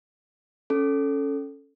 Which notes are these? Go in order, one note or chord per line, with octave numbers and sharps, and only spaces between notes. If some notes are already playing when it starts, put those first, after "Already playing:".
C#4 A4